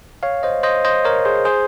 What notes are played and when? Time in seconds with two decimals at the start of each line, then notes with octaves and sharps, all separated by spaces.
0.23 C#5 F5
0.43 C5 D#5
0.63 C5 D#5
0.85 C5 D#5
1.05 A#4 C#5
1.25 G#4 C5
1.45 G#4 C5